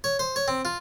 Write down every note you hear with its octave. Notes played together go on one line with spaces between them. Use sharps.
C#5
C5
C#5
C4
F4